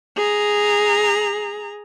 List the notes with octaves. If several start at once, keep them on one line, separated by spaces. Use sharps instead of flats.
G#4 A#5